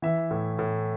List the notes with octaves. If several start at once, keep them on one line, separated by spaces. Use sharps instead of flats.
E3 E5
A2
A2